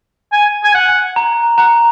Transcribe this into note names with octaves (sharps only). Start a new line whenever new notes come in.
G#5
G#5
F#5
A#5
F#5 A#5